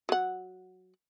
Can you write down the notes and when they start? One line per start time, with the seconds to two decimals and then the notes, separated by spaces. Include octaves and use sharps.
0.09 F#3 F#5